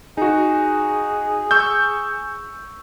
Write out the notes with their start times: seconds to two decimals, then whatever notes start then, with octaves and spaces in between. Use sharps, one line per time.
0.17 D#4 F#4 G#4
1.51 C#6 E6 G6